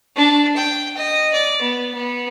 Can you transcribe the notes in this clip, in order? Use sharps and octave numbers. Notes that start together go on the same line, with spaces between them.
D4
G5
D#5
D5
B3
B3